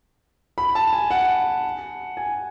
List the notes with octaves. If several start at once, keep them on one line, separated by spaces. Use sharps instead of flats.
B5
A5
G#5
F#5
G#5